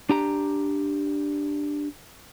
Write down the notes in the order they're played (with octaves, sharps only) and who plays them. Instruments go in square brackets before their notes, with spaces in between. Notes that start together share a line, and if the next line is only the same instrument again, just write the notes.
[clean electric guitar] D4 G4 A#5